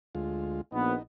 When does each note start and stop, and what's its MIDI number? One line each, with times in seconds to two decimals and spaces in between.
0.15 0.61 38
0.15 0.61 56
0.15 0.61 65
0.72 0.93 34
0.72 0.93 59
0.72 1.03 63